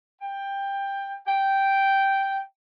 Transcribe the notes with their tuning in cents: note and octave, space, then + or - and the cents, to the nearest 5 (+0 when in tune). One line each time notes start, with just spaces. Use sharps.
G5 +15
G5 -5